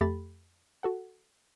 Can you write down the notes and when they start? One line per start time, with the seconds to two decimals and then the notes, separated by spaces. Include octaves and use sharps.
0.01 F2 A3 G4 A4 B5 A6
0.83 F#4 A4 F#5